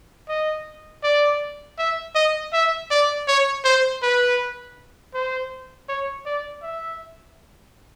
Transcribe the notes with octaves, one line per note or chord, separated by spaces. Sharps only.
D#5
D5
E5
D#5
E5
D5
C#5
C5
B4
C5
C#5
D5
E5